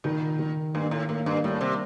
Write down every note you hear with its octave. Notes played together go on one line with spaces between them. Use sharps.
A#2 D#3
D#3
G2 A#3
A2
A2 A#3
G2
A2 G3
C3